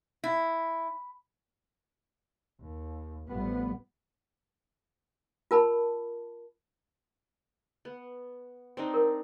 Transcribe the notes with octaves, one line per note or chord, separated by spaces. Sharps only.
E4
D#2
A1 A2 F3 G3 B3
F4 A#4 A5 B5
B3
C4 D4 D#4
A#4